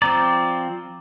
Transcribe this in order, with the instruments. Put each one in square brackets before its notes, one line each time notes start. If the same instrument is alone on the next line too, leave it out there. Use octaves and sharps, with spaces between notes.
[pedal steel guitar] F3 C4 D5 [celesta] A#5 D6